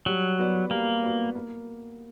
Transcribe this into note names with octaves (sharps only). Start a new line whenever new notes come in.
F#3 G3
B3 F#4 B4 D5
G3 A#3
B3 F#4 B4 D5
A#3